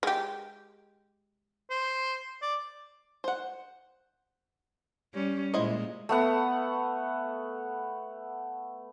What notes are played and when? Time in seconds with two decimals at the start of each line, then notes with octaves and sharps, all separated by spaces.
0.03 G#3 G4
1.71 C5
2.42 D5
3.24 C5 F#5
5.14 G3 C#4
5.54 A#2 G#3 E4 C5 D#5
6.09 A3 B3 F#5